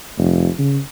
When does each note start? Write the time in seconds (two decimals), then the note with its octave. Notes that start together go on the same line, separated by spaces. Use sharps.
0.17 F1
0.58 C#3